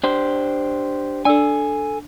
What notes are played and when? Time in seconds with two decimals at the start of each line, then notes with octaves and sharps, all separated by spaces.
0.03 D4 G4 C5
1.25 D4 A4 D5 G#5 E6